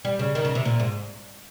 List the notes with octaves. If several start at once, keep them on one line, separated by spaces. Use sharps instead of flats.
G3
C#3
D#3
C#3
C3
A#2
G#2